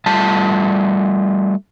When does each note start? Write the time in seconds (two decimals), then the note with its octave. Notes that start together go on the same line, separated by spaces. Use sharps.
0.06 G3 A3 F4 A5